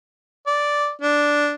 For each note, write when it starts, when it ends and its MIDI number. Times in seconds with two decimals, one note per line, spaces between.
0.47 0.90 74
1.01 1.53 62